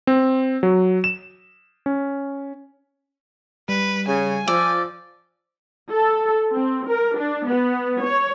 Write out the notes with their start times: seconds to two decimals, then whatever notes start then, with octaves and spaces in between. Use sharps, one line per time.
0.07 C4
0.63 F#3
1.04 E7
1.86 C#4
3.69 G3 B4
4.07 C#3 G#5
4.48 F3 D5 E6
5.92 A4
6.52 C4
6.86 A#4
7.17 D4
7.47 B3
8.02 C#5